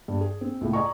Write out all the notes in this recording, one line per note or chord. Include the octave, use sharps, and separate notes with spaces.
G2
G#4
C4
C#2 A2
D5 D#5 G#5 A#5 C#6